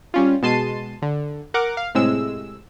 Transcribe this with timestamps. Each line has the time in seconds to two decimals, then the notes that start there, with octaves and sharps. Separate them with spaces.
0.14 G3 C#4 F4
0.43 B2 G#3 A5 C6 C7 D#7
1.02 D3
1.54 A#4 F#5 D6
1.77 F5
1.95 A2 C3 G#3 E6